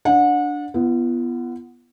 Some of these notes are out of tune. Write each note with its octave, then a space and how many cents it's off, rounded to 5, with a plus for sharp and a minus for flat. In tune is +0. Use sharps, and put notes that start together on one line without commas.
D4 +0 F#5 -30
B3 +0 F4 -45